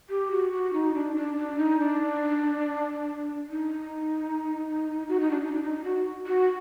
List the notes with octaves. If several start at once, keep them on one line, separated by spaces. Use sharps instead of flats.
G4
F#4
F#4
D#4
D4
D4
D4
D#4
D4
D#4
F#4
D#4
D4
D#4
D4
D#4
F#4
F#4